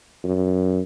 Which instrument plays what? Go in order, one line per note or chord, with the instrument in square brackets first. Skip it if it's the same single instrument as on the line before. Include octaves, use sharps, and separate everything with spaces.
[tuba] F#2